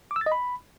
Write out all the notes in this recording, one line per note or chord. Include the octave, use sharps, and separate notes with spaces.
D6
E6
A6
D#5
B5